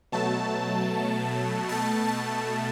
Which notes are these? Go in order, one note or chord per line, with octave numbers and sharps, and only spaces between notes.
B2 F#3 A3 A5
B2 A3 A5
A5